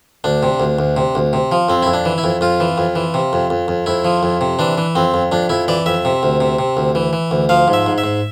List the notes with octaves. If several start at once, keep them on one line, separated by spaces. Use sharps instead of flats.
D2 D4
C3
D2
D2
C3
D2
C3
F3
F2 C4
F2 E4
D4
E3
E4
F2
F2 F4
E3
F2
E3
C3
F2
F2
F2
F2 E4
F3
F2
C3
E3 D4
E3
F2 C4
F2
F2 D4
F2 E4
E3 D5
F2 E5
C3
D2
C3
C3
D2
E3
E3
D2
F3 F5
G#2
E5
G#2
E5
G#2